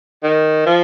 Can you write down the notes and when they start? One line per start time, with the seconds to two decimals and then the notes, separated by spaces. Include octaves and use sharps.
0.24 D#3
0.66 F3